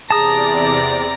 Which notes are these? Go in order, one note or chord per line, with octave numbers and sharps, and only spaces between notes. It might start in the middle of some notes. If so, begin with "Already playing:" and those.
E2 C3 G#4 D5 A5 A#5 D#6 A#6